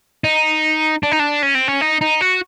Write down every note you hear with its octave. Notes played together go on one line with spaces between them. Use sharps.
D#4
D4
D#4
D4
C#4
C4
C#4
D#4
D#4
F#4